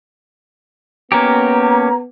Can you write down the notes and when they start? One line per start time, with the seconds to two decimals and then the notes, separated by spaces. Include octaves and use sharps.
1.12 A#3 B3 C#4 G4 A#5